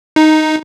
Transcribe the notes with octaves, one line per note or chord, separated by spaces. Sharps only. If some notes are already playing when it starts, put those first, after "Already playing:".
D#4